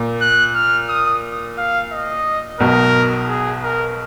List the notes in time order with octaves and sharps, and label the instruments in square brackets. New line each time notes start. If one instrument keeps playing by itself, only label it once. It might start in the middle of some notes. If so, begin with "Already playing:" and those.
Already playing: [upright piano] A#2
[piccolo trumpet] F#6
F6
D#6
F5
D#5
[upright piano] B1 B2 [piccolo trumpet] A#4
[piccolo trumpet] G#4
A#4